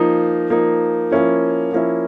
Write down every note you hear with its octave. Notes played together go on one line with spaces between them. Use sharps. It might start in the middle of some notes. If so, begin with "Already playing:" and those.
Already playing: F3 A#3 D#4
F3 A#3 D#4
F3 A#3 C#4 E4
F3 A#3 C#4 E4